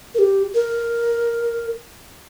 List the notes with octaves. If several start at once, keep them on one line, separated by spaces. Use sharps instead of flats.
A#4
G4
A#4